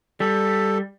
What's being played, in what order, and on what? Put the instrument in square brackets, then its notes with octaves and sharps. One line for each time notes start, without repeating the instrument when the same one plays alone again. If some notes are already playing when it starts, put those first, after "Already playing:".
[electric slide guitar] G3 [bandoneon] A4